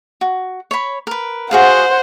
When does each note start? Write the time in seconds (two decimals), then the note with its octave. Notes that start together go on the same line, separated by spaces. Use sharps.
0.21 F#4
0.71 C#5 B5
1.07 A#4 B4
1.51 F#4 G#4 C5 F5 F#5